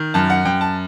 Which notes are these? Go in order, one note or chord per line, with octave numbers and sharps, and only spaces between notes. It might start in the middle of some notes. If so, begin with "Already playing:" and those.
Already playing: D#3
F#2 A5
F#5
F#2 G5
A5